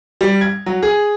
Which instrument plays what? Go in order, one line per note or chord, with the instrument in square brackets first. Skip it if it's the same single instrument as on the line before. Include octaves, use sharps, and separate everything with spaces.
[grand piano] G3
G#6
F#3
G#4